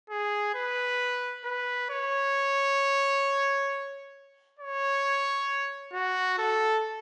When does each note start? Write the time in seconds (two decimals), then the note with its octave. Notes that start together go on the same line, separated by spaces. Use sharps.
0.10 G#4
0.55 B4
1.45 B4
1.90 C#5
4.59 C#5
5.93 F#4
6.38 A4